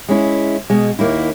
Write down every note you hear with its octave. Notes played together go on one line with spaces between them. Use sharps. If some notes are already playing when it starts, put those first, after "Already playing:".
G#3 C#4 E4
B2 G#3
D#2 A#3 D#4 E4